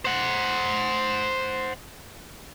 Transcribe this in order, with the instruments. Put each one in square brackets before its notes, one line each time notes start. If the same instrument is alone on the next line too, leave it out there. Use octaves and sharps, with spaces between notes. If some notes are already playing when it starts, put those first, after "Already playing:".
[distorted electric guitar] C5 F#5